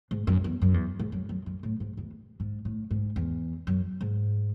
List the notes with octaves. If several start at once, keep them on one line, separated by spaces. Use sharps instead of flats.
G#2
F#2
E2
F#2
E2
G#2
F#2
F#2
F#2
A2
G#2
E2
G#2
A2
G#2
E2
F#2
G#2